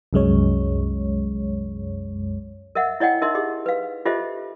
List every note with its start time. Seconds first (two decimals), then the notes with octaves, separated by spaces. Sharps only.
0.13 C2 F#2 G#3 C#5
2.75 A#4 D#5 E5 F#5
3.00 E4 C#5 D#5 F#5 G5
3.22 D#4 A#4 D#5 E5 C6
3.35 G4 G#4 D#5
3.66 B4 F5
4.05 F4 G4 A4 C5 D#5 E5